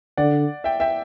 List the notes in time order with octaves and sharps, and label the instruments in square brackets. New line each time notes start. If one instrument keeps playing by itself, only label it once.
[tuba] D3 [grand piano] D5 F#5
[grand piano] E5 G5
E5 G5